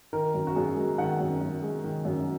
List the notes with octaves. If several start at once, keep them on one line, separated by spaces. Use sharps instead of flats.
D#3 A#4
F#2
F#4
F#2 G#4
G#3
D#3 F#5
F#2
F#2
G#3
D#3
F#2